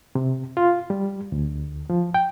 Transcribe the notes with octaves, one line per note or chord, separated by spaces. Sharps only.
C3
F4
G3
D2
F3
G5